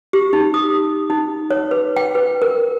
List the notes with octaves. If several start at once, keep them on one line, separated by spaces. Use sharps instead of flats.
G4
D#4
D#6
D#4
C#5
B4
G5
B4
A#4